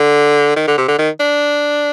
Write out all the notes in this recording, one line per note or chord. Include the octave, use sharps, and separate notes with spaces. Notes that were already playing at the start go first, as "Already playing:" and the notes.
Already playing: D3
D#3
D3
C3
D3
D#3
D4